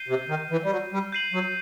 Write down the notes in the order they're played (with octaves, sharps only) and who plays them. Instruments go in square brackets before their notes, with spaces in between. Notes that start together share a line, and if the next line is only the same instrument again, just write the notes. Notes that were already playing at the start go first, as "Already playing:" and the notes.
Already playing: [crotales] G6 C7 D#7 G7
[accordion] C3
D#3
E3
G3
F#3
G3
[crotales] G6 C7 D#7 F#7
[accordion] F#3